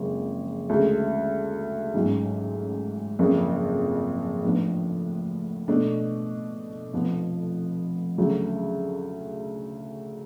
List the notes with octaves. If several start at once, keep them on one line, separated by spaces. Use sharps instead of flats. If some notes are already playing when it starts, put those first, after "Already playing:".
Already playing: F#1 F2 C#3 G#3
D2 C#3 G#3
A1 G#2 F#3 C#4
F#1 F2 C#3
A2 F3 B3 D4
B2 A3 D4
F1 F2 F3 B3
D2 C#3 F#3